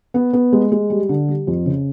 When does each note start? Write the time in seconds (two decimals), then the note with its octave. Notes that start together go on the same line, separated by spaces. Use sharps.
0.14 B3
0.33 B3
0.53 G#3
0.72 G#3
0.90 G3
1.09 D3
1.28 G3
1.47 F2
1.66 C#3